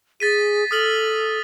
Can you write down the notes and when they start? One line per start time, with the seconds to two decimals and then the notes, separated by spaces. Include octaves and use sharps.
0.20 G#4 A6 B6 D#7
0.71 A4 D#6 F6 F#7